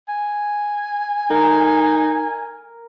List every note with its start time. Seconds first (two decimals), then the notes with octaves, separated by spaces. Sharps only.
0.08 G#5
1.30 D#4 A#4